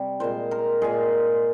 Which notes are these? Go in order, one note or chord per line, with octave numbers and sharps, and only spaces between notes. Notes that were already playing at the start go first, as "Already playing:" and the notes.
Already playing: C3 G3
A#2 G#3 C5
A#4
A#2 G#3 G#4